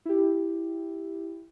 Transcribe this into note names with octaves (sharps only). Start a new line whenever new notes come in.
E4 G4